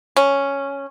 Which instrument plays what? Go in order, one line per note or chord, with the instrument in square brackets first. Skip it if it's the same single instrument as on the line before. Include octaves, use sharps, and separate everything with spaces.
[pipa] C#4